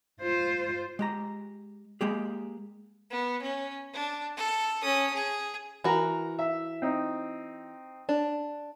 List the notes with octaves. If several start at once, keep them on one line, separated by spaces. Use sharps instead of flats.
F4 C5
G#3 G4 A#5
G#3 A#3 G4 G#4
B3
C#4
D4
A4
C#4 D#6
G#4
E3 F#4 A#4 A#5
E5
C4 D#4
D4